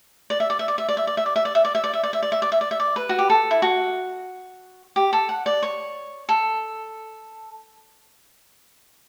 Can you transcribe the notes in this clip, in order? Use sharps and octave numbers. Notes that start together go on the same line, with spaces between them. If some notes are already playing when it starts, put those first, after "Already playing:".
D5
E5
D5
E5
D5
E5
D5
E5
D5
E5
D5
E5
D5
E5
D5
E5
D5
E5
D5
E5
D5
E5
D5
E5
D5
E5
D5
B4
F#4
G4
A4
E4
F#4
G4
A4
F#5
D5
C#5
A4